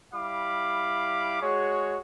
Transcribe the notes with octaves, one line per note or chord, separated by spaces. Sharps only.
G3 E4 F5 B5 D6
G#3 F#4 G#4 C#5